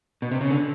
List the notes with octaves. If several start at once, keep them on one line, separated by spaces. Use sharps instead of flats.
B2
C3
C#3
D3